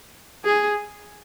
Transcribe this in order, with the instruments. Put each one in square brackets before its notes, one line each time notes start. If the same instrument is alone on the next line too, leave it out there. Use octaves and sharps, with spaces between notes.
[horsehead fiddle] G#4